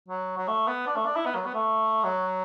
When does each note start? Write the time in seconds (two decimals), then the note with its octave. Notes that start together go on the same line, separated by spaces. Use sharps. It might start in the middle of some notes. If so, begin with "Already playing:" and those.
0.08 F#3
0.37 F#3
0.48 A3
0.68 B3
0.87 D4
0.96 A3
1.06 D4
1.16 E4
1.26 B3
1.35 F#3
1.46 B3
1.55 A3
2.04 F#3